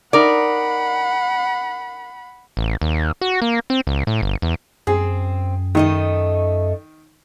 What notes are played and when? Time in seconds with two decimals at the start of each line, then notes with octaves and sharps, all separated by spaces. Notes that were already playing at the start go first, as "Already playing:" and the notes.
0.13 D#4 A#4 D5 F#5 B5
2.57 A1
2.82 D#2
3.21 F#4
3.42 A#3
3.70 C4
3.87 C#2
4.07 A2
4.22 G1
4.42 E2
4.87 F#2 C4 G#4
5.75 D#3 A3 D#4 D#5